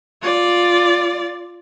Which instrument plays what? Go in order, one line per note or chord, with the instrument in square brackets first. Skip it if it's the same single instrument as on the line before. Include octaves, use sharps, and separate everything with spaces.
[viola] F4 D5